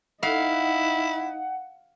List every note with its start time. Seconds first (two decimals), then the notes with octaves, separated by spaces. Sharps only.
0.23 D#4 E4 F5 F#5